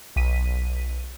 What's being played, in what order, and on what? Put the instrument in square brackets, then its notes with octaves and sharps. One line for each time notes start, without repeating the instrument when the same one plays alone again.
[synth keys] B1 B6 D#7